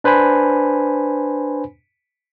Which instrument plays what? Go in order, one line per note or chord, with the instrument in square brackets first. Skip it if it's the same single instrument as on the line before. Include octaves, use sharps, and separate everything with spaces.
[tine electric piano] D4 B4 C5 G#5 B5